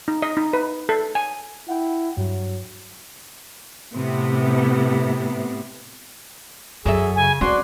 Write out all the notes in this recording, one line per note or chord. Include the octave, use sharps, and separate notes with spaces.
D#4
D#5
D#4
B4
A4
G#5
E4 F#5 G5
G2 F#3
A2 C3 B3
F#2 F#3 G#4 A4 E5
C#3 G#5
C4 D4 F#4 B4 C6